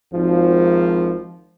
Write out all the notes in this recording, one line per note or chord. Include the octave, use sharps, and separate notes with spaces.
G#1 F3